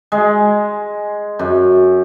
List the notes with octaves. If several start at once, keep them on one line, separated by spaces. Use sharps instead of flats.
G#3
F#2